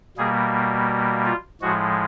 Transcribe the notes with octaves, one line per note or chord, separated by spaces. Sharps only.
B2 G3 A#3 G#4
F4
A2 F3 G#3 F#4